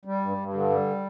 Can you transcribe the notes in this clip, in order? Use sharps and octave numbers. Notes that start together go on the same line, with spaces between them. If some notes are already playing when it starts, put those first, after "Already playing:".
G3
G2
G2
D3
G3